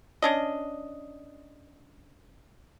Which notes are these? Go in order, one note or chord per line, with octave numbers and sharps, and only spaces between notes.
C#4 D4 D#5